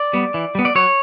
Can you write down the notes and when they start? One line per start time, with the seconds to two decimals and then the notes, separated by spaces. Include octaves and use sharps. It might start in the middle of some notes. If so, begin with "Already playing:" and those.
Already playing: D5
0.13 G3 B3
0.34 E3
0.55 G3 B3
0.65 D5
0.75 F#3 C#5